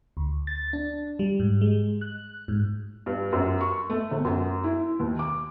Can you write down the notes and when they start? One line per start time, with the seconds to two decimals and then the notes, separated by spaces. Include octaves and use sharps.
0.17 D2
0.47 A6
0.73 D4
1.19 G3
1.40 G#2
1.61 G#3
2.01 F#6
2.48 G#2
3.06 G2
3.33 F#2
3.61 C#6
3.90 A3
4.11 G1
4.25 F#2
4.64 E4
5.00 D#2
5.19 D6